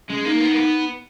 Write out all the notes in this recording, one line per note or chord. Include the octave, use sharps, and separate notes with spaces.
G#3 C#4
A#3 D#4
B3
A#3
B3